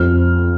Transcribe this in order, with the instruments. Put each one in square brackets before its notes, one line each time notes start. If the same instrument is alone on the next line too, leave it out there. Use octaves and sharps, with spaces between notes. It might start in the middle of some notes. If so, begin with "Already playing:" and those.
Already playing: [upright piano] F2 F6